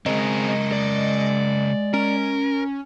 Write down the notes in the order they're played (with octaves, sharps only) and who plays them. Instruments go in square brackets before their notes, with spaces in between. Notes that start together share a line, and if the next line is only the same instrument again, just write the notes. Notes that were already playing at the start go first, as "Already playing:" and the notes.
[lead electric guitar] C#3 A#4 [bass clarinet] G#3 [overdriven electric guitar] C4 G#4 [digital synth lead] D#5
[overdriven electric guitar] D5
[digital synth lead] C#4 [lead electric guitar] A#4